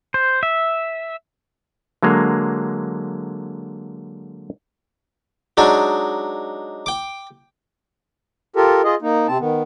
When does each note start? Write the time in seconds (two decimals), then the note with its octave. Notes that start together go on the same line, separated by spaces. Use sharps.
0.14 C5
0.43 E5
2.03 D3 F#3 G#3 A#3
5.57 F#3 G#3 D4 D#4
6.86 G5 D6
8.56 F4 G4 A4 A#4
8.84 F4 G#4 D#5
9.02 A#3 D#4
9.28 C3 C4 A5
9.40 D#3 B3